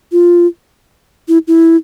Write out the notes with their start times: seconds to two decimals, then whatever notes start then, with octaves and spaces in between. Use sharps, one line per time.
0.12 F4
1.28 E4
1.48 E4